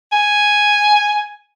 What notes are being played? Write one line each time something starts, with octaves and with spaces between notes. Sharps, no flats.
G#5